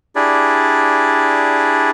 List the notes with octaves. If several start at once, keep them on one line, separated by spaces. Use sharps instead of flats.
D4 E4 G4 G#4 D5